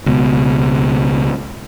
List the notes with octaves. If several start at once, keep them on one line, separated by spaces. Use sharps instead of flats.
C#2 B2